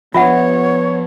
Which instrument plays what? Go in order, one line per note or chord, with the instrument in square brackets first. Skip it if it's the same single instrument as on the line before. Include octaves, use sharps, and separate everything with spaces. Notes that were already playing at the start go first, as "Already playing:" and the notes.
[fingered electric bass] F3 D4 [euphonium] B3 [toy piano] F4 E5 F#5 [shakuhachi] C#5